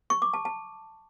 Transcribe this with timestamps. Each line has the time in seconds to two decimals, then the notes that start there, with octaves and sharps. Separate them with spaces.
0.10 C#6
0.22 D6
0.34 A5
0.45 A5